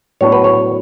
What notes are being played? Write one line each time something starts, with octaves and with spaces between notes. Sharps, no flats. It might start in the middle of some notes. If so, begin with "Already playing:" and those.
A2 F#3 B3 D4 C#5
B4
C#5